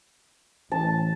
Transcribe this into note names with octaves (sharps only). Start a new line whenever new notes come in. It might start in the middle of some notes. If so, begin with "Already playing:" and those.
A1 A5